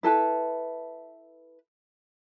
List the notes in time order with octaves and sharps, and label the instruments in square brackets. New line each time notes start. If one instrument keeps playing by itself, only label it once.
[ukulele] E4 A4 B4 A5